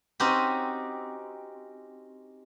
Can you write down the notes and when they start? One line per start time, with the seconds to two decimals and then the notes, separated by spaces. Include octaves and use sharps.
0.20 C4 C#4 D#4 F#4 G4